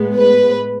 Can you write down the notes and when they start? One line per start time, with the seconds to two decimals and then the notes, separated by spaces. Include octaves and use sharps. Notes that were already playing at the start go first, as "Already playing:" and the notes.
Already playing: A2 G#3 B3
0.17 B4